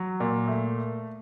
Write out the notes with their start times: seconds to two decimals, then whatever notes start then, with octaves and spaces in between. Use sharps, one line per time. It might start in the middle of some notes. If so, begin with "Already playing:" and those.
Already playing: F#3
0.20 A#2
0.48 A3